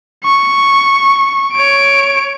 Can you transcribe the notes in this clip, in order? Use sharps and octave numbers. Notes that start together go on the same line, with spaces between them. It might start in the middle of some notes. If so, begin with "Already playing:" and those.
C#6
C#5 D7